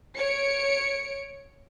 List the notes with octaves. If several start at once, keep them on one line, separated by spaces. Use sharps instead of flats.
C#5 C#7 D7